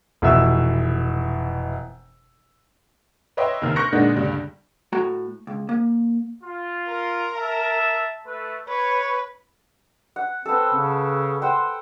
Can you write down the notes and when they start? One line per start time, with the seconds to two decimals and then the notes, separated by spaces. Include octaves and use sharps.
0.22 F1 B2 E3 E5 E6
3.37 B4 C#5 D#5 E5 G5 C6
3.62 D#2 C3 F6
3.76 C#6 F#6 G6 A#6 C#7
3.92 A#2 D3 G#3 B3 D4 D#4
4.16 C#2 G2 D3 G3
4.93 A2 A3 F#4 A#5
5.47 C#2
5.69 A#3
6.44 F4
6.88 A#4
7.36 E5 A5
8.26 A3 B4
8.68 B4 C#5
10.16 F#5
10.46 B3 C4 A4
10.74 C#3
11.42 C5 F#5 G5